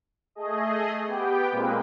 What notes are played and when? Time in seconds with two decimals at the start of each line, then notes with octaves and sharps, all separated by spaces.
0.35 A3 G#4 D#5
1.06 B3 G4 G5
1.51 A#2 G#3 A#3 C4 B4